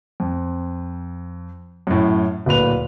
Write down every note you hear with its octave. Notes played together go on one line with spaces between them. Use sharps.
F2
F#2 A2
D1 A#2 B4 F7